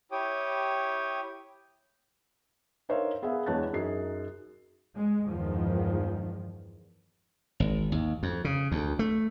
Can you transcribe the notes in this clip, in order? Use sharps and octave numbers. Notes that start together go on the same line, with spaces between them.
E4 G4 C#5 G5 D#6
D#4 A#4 C5 C#5 E5 F5
B3 G#4 B4 E5 F5
E2 G#3 C#5 A5 F#6 A6
F#2 D#4 G#4 C7
G#3
E2 G2 D#3 F3 G#3
G#1
D#2
F2
C#3
D2
A3